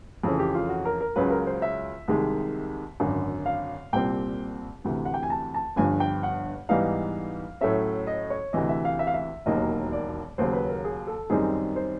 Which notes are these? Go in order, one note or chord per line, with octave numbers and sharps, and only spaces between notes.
F2 C#3 E3 A3 C#4 A4
G4
F4
F#4
A#4
A#4
C#2 C#3 F#3 B4
A#4
C5
E5
C2 C3 D#3 G#3
G#1 F#2 D3
F5
C2 A#2 G3 C4 G5
D2 C3 E3
F#5
G5
G#5
A5
A5
G1 G2 D3 F3 G#5
G5
F#5
G#2 E3 G3 B3 D#4 F5
A2 F#3 A3 C#4 E5
D#5
C#5
D2 C3 E3 D#5
E5
F5
E5
F5
E5
E1 D#2 D#3 F#3 A#3 D#5
D5
D#2 C#3 F#3 C5
B4
A#4
G#4
A4
F#2 D#3 G3 C4 D#4 G#4
C5